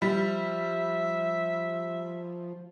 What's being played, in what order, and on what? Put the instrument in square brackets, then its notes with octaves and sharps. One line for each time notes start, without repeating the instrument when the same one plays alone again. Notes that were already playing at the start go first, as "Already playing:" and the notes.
[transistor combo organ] F3 [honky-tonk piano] G3 [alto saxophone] E5